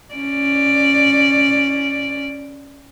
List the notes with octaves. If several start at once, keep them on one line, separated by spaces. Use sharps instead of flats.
C#4 D5